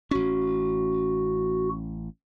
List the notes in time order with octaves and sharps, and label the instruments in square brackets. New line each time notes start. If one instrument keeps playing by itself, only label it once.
[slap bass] A1 C#4 [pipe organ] F#4